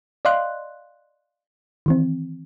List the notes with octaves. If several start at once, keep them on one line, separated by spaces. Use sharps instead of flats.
D5 D#5 F5 C6 F#6
D#3 E3 C4